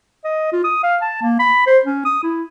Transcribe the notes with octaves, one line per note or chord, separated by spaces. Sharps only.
D#5
F4
D#6
F5
A5
A#3
B5
C5
C#4
D#6
E4